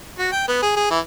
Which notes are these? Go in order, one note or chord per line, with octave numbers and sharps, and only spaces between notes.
F#4
G5
B3
G#4
G#4
E3